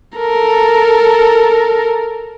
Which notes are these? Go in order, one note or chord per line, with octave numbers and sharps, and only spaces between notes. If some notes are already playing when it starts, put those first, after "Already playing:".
A4 A#4